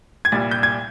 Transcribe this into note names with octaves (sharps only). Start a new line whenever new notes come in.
G#6
C2 A#2 G3 A6
G6
G#6